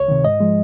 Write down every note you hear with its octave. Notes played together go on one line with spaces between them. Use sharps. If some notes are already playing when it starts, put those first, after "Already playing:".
Already playing: C#2 C#5
C3 D#3
G#2 D#5
F3 G#3